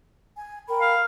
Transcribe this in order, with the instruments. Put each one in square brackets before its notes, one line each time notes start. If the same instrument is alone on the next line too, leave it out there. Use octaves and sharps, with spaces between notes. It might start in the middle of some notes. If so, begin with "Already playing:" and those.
[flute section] G#5
A#4 G5 B5
[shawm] F5